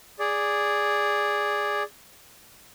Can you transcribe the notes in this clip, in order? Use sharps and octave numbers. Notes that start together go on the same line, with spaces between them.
G#4 D5